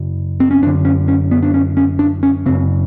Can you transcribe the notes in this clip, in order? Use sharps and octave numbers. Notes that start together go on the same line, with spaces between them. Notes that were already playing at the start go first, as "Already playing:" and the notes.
Already playing: F#2 C#3
C4
C#4
F#2 D3 D4
C#4
C#4
B3
D4
C#4
C#4
D4
C#4
F#2 C#3 C4